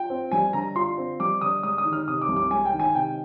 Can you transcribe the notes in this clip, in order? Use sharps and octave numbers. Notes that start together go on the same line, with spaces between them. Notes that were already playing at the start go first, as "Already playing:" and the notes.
Already playing: F4 G5
C4
G3 G#5
D3 A#5
F4 C6
C4
G3 D6
D3 D#6
G#3 D#6
D#6
D#3
F6
C3 D#6
D6
C2
D6
G#3 G#5
G5
D#3
G#5
C3 G5